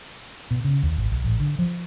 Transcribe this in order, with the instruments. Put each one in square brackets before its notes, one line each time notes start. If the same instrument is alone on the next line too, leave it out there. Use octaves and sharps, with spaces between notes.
[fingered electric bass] B2
C#3
D#2
G#1
B1
A1
D3
F3